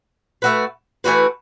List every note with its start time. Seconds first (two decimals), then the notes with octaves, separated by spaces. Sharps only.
0.42 A3 F#4 B4
1.04 E3 A3 F#4 B4